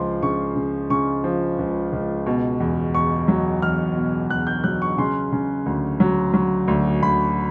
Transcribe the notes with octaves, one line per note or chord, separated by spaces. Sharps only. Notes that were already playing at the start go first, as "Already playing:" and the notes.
Already playing: C#2 F3 C6
C#3 C#6
C#3
C#3 C#6
F3
C#2
C#2
B2
E2
E2 C#6
F#3
E2 F6
B2
E2 F#6
G6
F#3 F#6
C#6
C#3 C6
C#3
D2
F#3
F#3
D2
D2 B5